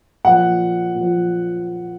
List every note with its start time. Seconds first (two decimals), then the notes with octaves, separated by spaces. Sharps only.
0.25 A#2 F3 F#5
0.95 A#2 F3